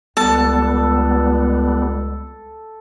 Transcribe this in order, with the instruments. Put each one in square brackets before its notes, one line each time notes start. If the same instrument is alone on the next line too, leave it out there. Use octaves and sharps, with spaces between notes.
[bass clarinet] C#2 [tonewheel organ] G3 B3 [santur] A4 [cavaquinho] A5